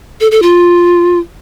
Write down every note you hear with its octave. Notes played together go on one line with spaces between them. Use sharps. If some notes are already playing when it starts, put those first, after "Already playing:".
A4
A4
F4